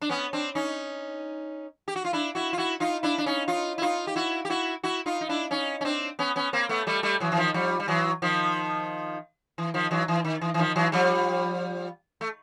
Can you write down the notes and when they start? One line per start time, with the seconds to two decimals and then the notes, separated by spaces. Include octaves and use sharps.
0.02 D4
0.09 B3 C#4
0.33 C4 D4
0.55 C#4 D#4
1.88 G4
1.96 F#4
2.05 F4
2.13 D4 E4
2.35 E4 F#4
2.53 F4
2.57 E4 F#4
2.80 D#4 F4
3.03 D4 E4
3.18 D4
3.26 C#4 D#4
3.48 D#4 F4
3.78 E4
3.82 D#4 F4
4.07 G4
4.16 E4 F#4
4.45 G4
4.50 E4 F#4
4.84 E4 F#4
5.06 D#4 F4
5.21 D#4
5.29 D4 E4
5.51 C#4 D#4
5.81 C#4
5.85 C4 D4
6.19 B3 C#4
6.36 B3 C#4
6.53 A#3 C4
6.69 A3 B3
6.87 G3 A3
7.03 G3 A3
7.20 E3 F#3
7.32 E3
7.37 D#3 F3
7.54 F3 G3
7.80 G3
7.88 E3 F#3
8.22 D#3 F3
9.58 E3
9.74 D#3 F3
9.91 E3 F#3
10.08 E3
10.24 D#3
10.41 E3
10.54 E3
10.59 D#3 F3
10.76 E3 F#3
10.92 F3 G3
12.21 A3